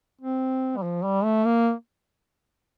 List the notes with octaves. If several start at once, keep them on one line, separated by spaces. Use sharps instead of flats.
C4
G3
F3
G3
A3
A#3